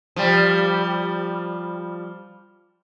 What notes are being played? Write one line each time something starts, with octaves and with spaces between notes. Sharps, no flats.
F3 G3